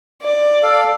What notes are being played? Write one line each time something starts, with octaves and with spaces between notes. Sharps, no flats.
D5
A4 F5